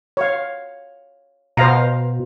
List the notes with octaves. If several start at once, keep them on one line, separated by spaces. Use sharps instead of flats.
C#5 F5
B2 C5 F5 A#5